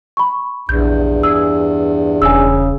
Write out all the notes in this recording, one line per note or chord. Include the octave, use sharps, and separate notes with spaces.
B5 C#6
A#1 E2 G2 G6
G#4 E6
E1 C#3 G#5 E6